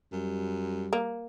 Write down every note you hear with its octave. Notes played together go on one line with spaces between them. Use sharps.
F#2 G3
A#3